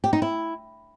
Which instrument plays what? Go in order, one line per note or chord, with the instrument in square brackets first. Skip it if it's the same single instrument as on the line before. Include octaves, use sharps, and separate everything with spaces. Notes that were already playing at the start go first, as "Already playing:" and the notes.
[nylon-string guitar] G4
D#4
E4